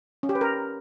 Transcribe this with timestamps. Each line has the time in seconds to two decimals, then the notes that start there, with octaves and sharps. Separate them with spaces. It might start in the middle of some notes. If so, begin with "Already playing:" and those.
0.23 C#4
0.29 G4
0.35 B4
0.41 A#4